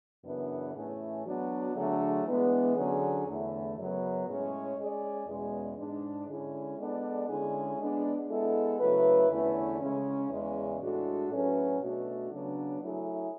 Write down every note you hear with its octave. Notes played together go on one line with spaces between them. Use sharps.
F#2 C#3 E3 B3 D4
A2 E3 A3 C#4 G#4
F#3 B3 D4 F#4
D3 F#3 A3 D4 G#4
E3 G#3 B3 D4
D3 F#3 C#4 G#4
E2 D3 A3 E4
F#2 C#3 F#3 B3
A2 G#3 C#4 G#4 C#5
G#3 C#4 G#4 D5
E2 B2 G#3 C#4
G#2 G#3 D4
D3 G#3 C#4 E4 G#4
G#3 B3 D4 A4 D5
D3 G#3 C#4 E4 G#4
G#3 B3 D4 G#4 D5
G#3 B3 E4 A4
C#3 F#3 A3 E4 B4
E2 D3 A3 C#4 E4
C#3 G#3 C#4
E2 C#3 G#3
A2 G#3 D4 F#4 A4
A2 F#3 C#4 G#4 B4
B2 A3 D4 F#4
C#3 F#3 B3 D4
F#3 A3 E4 G#4